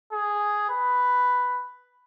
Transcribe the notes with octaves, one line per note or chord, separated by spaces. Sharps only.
G#4
B4